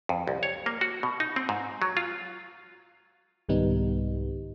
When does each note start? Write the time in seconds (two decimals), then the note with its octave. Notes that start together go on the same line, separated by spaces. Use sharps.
0.09 F2
0.27 C2
0.43 C#5
0.66 A#3
0.81 F#4
1.03 B2
1.20 D#4
1.36 C4
1.49 G#2
1.82 F#3
1.97 F4
3.49 C2 G#2 D#3 G3 B3 D#4